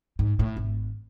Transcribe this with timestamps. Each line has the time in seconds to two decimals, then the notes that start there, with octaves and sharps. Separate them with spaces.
0.19 G#2
0.39 A2
0.57 G#1